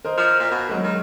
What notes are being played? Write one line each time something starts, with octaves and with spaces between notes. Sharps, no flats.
A#4 C5 D#5
F3
A#2
B2
F#2 F#3 G#3 A#3
D#3